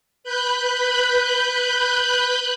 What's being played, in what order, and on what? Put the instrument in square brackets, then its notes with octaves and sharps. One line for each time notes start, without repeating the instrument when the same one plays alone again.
[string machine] B4 B5 F#6 G6